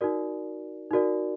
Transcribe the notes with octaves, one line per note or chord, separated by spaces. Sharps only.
D#4 F#4 A#4 D5
D#4 F#4 A#4 D5